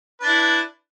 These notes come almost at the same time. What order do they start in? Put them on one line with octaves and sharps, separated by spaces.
B4 D4 E4